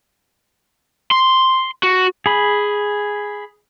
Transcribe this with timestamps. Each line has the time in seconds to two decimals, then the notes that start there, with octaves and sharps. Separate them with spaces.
1.11 C6
1.83 F#4
2.26 G#4 B5